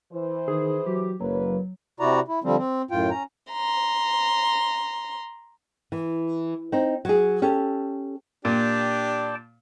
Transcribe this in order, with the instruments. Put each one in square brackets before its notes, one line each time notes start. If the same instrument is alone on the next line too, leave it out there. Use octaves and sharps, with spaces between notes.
[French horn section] E3 C5
[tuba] D#3 [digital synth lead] G#4
[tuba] F#3 [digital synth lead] G4
[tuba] F#1 [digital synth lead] F#3 [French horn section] A#3 B4
[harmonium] C3 E4 F#4 D5 A#5
E4
D3 F3 G3 C4
C4
F#2 A2 F4 G5
C#4 A#5
[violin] A#5 C6
[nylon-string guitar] E3
C4 D#4
F#3 G#4
C#4 G4 A4
[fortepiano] A#2 [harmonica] D4 G4 [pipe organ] D5 G5 A5